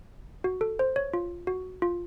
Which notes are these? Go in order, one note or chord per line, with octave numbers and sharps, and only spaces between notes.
F#4
A4
C5
C#5
F4
F#4
F4